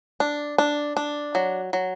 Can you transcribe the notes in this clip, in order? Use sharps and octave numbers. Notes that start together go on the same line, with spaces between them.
D4
D4
D4
F#3
F#3